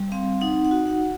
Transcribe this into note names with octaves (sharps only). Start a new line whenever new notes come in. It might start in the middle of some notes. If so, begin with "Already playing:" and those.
Already playing: G3
C4 F5
D#4 F#5
F#5
F#4
F#5